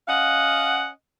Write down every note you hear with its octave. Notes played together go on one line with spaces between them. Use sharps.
C#4 D#5 F5 F#5